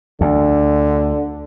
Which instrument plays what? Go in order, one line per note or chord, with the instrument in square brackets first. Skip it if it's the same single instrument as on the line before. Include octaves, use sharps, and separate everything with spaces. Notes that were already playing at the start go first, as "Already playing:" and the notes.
[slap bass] D2 [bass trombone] D3